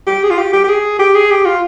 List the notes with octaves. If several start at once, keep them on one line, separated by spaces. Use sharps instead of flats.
G4
G#4
F4
G4
G4
G4
G#4
G4
G#4
G4
F4